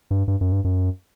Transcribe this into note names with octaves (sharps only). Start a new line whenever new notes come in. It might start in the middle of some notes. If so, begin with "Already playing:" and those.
G2
G2
F#2
G2
F#2